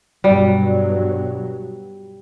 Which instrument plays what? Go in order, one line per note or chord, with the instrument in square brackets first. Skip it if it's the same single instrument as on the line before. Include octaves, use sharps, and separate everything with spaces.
[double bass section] G2 B2 F#3 [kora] G3